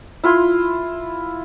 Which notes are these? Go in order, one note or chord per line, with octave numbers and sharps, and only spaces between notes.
E4 F4 C6